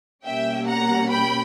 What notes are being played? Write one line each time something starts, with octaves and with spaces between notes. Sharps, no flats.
B2 G3 A#3 C#4 E5 G5
F#5 A#5
G5 B5